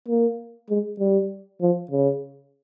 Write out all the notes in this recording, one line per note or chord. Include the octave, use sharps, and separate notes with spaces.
A#3
G#3
G3
F3
C#3